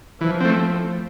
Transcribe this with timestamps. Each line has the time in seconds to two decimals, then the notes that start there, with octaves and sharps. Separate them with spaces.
0.21 E3 F3
0.41 A3 C4